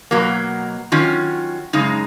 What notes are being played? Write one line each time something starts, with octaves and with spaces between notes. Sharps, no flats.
B2 F#3 A#3
D#3 F#3 C#4 F4
F#2 C#3 G#3 D#4